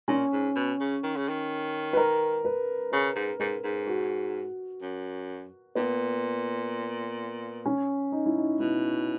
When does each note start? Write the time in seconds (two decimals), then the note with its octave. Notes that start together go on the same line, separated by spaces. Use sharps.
0.08 A#2 C#4
0.32 G#2
0.56 B2
0.80 C#3
1.03 D#3
1.16 C#3
1.29 D#3
1.93 B4
1.97 A#4
2.45 B4
2.92 C#3 B4
3.15 G#2
3.40 G#2 A#4
3.64 G#2
3.87 F#4
4.81 F#2
5.75 A#2 B3
7.66 C#4
8.12 D#4
8.26 E4
8.38 D#4
8.60 B2 E4